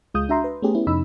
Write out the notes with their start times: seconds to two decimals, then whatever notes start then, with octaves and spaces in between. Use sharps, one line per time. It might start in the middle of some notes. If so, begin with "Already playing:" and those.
0.14 C#2 G#3 F4 D#6 G6
0.29 D4 F#4 E5 A#5 C6
0.44 B4
0.62 A3 B3 C#4 G4 G#4
0.75 B3 C#4 E4
0.87 F2 C3 D#4 B5 E6